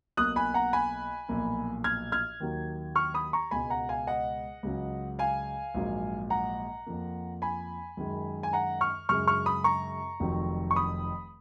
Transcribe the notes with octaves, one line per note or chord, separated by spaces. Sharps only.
B1 B2 A#3 D#6 F#6
G#5 B5
F#5 A#5
G#5 B5
B1 A#2 F3 A#3
F6 G#6
F6 G#6
D#2 D#3 F#3 A#3
C#6 F6
B5 D#6
A#5 C#6
C#2 B2 G#3 G#5 B5
F#5 A#5
F5 G#5
D#5 F#5
C#2 C#3 F#3
F5 G#5
A#1 G#2 F#3 A#3
F#5 A#5
F2 F3 A#3
G#5 B5
F#2 D#3 G#3
G#5
F#5 A#5
C#6 F6
F#2 C#3 G#3 C#6 F6
C#6 F6
B5 D#6
A#5 C#6
F1 F2 D#3 F#3
C#6
B5 D#6